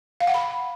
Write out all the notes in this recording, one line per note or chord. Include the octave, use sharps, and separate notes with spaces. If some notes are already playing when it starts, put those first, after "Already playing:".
F5
F#5
B5